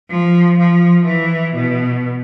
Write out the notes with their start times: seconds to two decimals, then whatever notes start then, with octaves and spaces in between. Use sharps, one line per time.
0.10 F3
0.58 F3
1.06 E3
1.54 B2